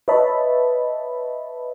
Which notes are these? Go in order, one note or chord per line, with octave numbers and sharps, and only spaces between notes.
B4 C#5 D#5 E5 A5 B5